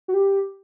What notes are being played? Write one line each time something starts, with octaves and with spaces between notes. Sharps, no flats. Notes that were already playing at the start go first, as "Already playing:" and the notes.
F#4
G4